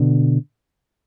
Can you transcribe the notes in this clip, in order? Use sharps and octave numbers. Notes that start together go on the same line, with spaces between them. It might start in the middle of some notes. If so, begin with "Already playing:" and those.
Already playing: B2 D3